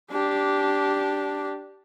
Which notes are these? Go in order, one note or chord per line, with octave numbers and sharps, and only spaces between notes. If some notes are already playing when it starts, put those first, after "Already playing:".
D4 G4